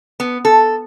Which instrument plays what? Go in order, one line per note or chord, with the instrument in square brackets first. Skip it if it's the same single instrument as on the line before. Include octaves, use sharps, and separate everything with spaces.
[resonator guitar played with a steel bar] B3
A4